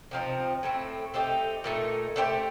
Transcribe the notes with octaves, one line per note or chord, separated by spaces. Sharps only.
C3 F3 C4 D#4
A2 A3 C4
A3 C4 D#4 G4
A#2 A3 D#4
A3 D4 G4 C5